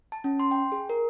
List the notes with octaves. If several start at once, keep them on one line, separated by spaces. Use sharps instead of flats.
A5
C#4
C6
G5
G#4
A#4